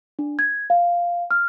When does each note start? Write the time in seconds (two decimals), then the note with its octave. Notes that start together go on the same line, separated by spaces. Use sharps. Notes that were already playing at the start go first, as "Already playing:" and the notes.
0.19 D4
0.39 G#6
0.70 F5
1.31 F6